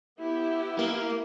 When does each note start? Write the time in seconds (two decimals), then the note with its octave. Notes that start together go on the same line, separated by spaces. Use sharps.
0.19 B3 E4 G4
0.79 A#3